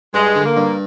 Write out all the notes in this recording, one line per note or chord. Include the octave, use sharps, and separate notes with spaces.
G2 G#3
D3
A#3
G2